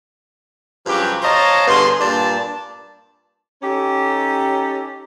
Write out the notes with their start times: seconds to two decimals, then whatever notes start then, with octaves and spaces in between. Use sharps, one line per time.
0.86 G2 C#3 F3 F#3 G4
1.22 C5 C#5 D#5 F5 A5 A#5
1.68 G2 D3 B3 G#4 C6
2.01 G2 A#2 D4 A5
3.63 C#4 D#4 G4 A4 A#5